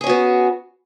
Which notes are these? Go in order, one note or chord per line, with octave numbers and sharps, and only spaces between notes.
B3 C#4 F#4 G#4